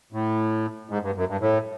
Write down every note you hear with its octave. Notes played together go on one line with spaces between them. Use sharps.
A2
G#2
G2
F#2
G2
A2